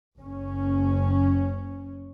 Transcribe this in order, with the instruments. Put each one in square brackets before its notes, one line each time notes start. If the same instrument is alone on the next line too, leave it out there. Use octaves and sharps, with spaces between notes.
[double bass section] F#1 C#4